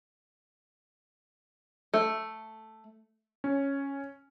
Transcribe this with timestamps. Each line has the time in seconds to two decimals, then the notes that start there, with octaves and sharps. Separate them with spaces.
1.94 A3
3.44 C#4